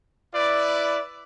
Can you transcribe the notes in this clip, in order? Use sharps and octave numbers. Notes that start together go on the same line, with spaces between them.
E4 B4 D5